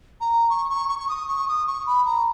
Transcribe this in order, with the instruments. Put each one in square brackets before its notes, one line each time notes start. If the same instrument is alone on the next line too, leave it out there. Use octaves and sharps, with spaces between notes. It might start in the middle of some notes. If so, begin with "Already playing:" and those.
[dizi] A#5
C#6
C#6
C#6
C#6
D#6
C#6
D#6
C#6
B5
A#5